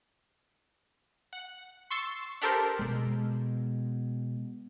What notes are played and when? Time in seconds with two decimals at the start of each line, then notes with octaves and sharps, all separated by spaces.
1.33 F#5
1.90 C6 C#6 E6 A6 C7 C#7
2.42 D4 G4 A4 A#4 C5
2.79 B2 G#3